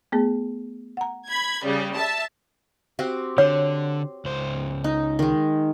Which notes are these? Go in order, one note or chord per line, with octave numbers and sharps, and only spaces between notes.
A3 B3 G#4
F#5 A#5
B5 G#6
C#3 G3
E5 A5
C4 F#4 G4
D3 C#5 C6
C#2 C5
D#4
D#3 G#3